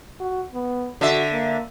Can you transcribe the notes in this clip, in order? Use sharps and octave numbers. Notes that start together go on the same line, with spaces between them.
F#4
B3
D3 F#4 E5
A#3